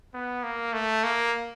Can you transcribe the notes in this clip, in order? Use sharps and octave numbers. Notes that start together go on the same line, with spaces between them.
B3
A#3
A3
A#3